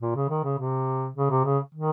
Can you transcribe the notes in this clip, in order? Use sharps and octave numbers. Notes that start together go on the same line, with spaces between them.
A#2
C#3
D#3
C#3
C3
C#3
C3
C#3
D#3